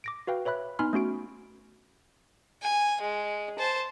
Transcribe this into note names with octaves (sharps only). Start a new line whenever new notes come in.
D6 A#6 D7
F#4 B4 F5 G5
B4 C#5 E5 B5 F#6
B3 D#4 G#5 B5 C6 F6
A3 C#4 F#4 D7
G#5
G#3
C5 A5